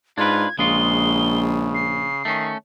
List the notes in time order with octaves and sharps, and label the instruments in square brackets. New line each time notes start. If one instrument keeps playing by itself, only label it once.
[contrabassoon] G#2 [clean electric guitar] D4 B4 [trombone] F4 [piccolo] G#6
[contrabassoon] A#1 [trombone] C#3 [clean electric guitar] G#3 F4 [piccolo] G7
[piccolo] C7
[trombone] D#3 [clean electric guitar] A3 C#4